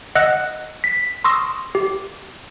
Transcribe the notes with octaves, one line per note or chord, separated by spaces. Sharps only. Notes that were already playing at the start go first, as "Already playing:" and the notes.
D#5 F#5 E6 F#6 C#7
B6
C6 C#6 D#6 E6 A#6
G4